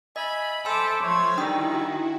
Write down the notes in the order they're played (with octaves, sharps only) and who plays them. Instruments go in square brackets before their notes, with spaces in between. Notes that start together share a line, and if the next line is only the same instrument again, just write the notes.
[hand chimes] D#5 [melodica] E5 G#5 [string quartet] B5
[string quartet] A4 E5 D6 [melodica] C5 [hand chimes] G#5 B5 E6
[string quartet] F3 G#6 [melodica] A3 C5 C#5 [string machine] F6 A6 B6
[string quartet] D#3 [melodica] G3 E6 [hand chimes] D4 G5 D#6 [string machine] E4 F#4